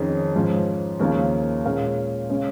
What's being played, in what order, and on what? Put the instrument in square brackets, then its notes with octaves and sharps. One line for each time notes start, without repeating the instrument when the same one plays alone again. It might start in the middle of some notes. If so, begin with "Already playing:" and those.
Already playing: [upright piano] F2 D#3 C#4 G#4
G#2 F3 C#4
D#2 C#3 F3 A#3 C#4
A#2 G#3 C#4 A#4 F5
C#3 G#3 C#4